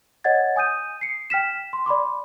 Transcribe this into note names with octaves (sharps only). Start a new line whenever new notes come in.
C#5 D#5 F#5 G#6 A6
G#5 D#6 G6 D#7
C7 C#7
G5 F6 B6 E7
C6
D5 B5 C6 D6